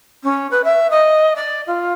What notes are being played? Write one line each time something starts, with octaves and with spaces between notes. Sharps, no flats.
C#4
B4
E5
D#5
D5
F4